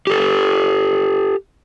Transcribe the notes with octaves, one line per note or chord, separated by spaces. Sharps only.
G4 A4